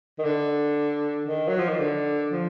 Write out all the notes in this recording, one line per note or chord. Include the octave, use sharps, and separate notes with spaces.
D#3
D3
D#3
F#3
F3
D#3
D3
F3